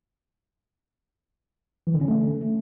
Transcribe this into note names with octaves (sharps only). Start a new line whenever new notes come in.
E3
D3
C#4
A3